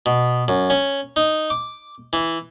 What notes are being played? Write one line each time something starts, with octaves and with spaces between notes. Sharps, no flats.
B2
F#2
C#4
D#4
D6
E3